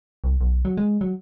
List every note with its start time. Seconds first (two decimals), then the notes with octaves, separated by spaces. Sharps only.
0.24 C2
0.41 B1
0.65 F#3
0.77 G#3
1.01 F#3